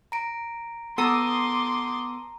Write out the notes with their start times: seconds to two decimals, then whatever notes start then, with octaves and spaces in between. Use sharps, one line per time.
0.12 A#5 D7
0.98 B3 A4 A#5 C6 D6 D#6